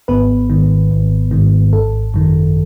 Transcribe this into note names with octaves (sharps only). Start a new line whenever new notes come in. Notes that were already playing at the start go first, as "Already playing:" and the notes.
G#1 B3 B4
G#2 D#3
G#1
G#2 D#3
G#1 A4
F#2 D#3